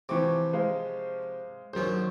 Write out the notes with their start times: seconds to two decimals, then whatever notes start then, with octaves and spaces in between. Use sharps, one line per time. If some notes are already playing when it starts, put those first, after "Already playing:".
0.09 C3 E3 F3 C4 C#6 D6
0.53 G#3 C5 F5
1.74 A#1 D#2 F#3 C#4 C5